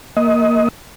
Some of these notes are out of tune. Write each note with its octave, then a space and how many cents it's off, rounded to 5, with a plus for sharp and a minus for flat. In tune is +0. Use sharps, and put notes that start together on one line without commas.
A#3 +0 D#5 +25